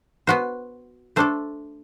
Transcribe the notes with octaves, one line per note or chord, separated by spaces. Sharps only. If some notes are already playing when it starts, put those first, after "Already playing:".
B3 F#4 C5
A3 D4 A4 C5